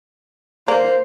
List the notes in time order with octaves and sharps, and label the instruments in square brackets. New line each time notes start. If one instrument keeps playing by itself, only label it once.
[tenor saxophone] A#3 [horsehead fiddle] C5 [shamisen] D5 A#5